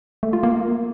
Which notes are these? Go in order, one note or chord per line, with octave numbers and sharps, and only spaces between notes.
A3
F4
A#3